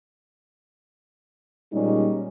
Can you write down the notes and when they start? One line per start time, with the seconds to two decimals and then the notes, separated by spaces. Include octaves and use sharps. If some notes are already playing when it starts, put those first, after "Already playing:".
1.72 A#2 G3 G#3 C#4 D#4